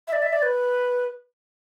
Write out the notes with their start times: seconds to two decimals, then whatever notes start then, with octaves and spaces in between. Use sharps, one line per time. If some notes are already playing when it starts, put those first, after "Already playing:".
0.08 E5
0.13 D5
0.22 E5
0.33 D5
0.43 B4